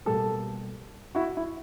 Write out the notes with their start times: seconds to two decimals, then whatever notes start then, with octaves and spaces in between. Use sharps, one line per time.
0.05 B2 G3 A#3 G4 A4
1.15 E4 F#4
1.37 E4